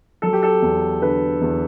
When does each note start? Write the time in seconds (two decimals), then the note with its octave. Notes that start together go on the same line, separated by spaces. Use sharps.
0.22 F#3 A4
0.33 G4
0.43 A4
0.62 E2
1.01 D3 B4
1.41 E2